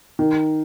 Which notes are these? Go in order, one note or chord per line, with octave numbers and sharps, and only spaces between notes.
D#3